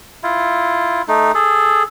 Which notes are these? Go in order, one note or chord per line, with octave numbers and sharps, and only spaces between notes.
E4 F4
A3 D#4
G#4 A4